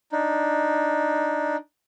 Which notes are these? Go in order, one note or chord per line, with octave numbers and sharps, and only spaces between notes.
D4 D#4